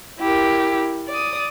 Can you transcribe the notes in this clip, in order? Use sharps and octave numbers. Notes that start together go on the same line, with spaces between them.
E4 G4 A#4
D5 D#6